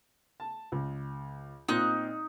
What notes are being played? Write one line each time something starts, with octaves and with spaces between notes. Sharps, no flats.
A5
C#2
A#2 C4 D#4 F4 F#6